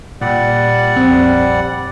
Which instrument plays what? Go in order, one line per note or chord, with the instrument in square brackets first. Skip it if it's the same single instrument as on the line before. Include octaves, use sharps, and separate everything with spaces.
[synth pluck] A#2 [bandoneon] G3 D5 F#5
[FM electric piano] A#1 F2 [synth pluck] C4